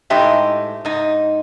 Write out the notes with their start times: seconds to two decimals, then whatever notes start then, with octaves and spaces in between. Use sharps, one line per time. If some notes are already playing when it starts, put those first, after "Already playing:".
0.10 A2 G#3 D#4 G4 C5 E5
0.85 G#2 D#4